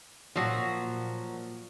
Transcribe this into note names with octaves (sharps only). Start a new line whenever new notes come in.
A#2 F3 F#3 F#4